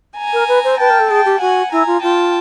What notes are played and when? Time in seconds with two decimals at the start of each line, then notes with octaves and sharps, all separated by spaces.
0.18 G#5 A#5
0.33 A#4
0.48 B4
0.64 C5
0.79 B4 G5 A5
0.90 A#4
1.00 A4
1.10 G#4 G5 A5
1.25 G4
1.41 F#4 F#5 G#5
1.72 E4 G#5 A#5
1.87 F4
2.02 F4 G5 A5